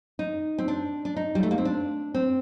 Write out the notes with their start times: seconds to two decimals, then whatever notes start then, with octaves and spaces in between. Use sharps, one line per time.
0.19 D#4
0.58 C4
0.68 D4
1.05 D4
1.16 D#4
1.35 G3
1.43 A3
1.51 A#3
1.58 C4
1.65 D4
2.14 C4